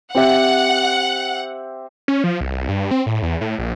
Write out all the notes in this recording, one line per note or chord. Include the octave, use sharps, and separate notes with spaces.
C4 G4 E5 F#5
C#4
F3
C2
G2
C4
A2
E2
A2
A#1